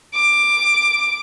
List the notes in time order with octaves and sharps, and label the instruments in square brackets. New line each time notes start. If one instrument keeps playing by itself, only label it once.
[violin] D6